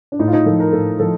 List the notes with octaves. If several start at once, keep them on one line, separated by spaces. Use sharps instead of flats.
D4
A2 D#4
F4
D#4
F3 A4
A#4
A2 A4
F3 A4